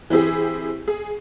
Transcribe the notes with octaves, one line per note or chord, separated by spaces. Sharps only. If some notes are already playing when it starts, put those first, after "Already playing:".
E3 C4 E4 G4 G#4
G#4